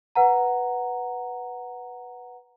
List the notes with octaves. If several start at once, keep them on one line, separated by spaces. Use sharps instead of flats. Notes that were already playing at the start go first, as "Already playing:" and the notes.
B4 F#5 A#5